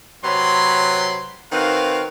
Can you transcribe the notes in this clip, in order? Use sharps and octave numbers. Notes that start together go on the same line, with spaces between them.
C3 F#3 B4 C#5 B5 C6
D#3 C4 F#4 B4 F5